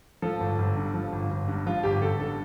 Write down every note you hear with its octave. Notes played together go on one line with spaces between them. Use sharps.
F3 A4
G1
G1
G2
F3
G1
G1
G2
F3 F4
G1 G4
G1 A4
G2 A4